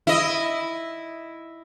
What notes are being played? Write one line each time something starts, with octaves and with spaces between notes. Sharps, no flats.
E4 D#5